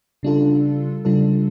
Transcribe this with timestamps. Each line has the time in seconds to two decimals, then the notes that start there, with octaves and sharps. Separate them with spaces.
0.23 C#3 G3 D4 F4 A4
1.05 C#3 G3 D4 F4 A4